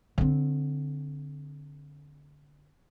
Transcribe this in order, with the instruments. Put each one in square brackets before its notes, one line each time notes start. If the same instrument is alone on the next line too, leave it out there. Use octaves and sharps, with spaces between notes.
[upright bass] D3 C4